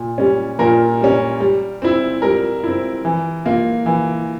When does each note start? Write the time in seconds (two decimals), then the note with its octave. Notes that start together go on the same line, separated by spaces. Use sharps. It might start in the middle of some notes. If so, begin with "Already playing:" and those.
Already playing: A#2
0.18 G3 C#4
0.59 A#2 A#4
1.01 G3 C#4
1.40 G3
1.82 C4 E4
2.22 G3 A#4
2.64 C4 E4
3.05 E3
3.45 A#3 F4
3.86 E3